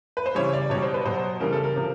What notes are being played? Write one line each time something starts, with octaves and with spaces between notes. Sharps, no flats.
B4
C5
C#3 E3 G3 C#5
D5
B2 G3 C#5
C5
B4
B2 F#3 C5
C#3 E3 G3 A#4
A4
A#4
C3 F3